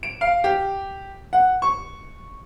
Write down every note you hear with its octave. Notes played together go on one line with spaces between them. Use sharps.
D7
F5
G4
F#5
C#6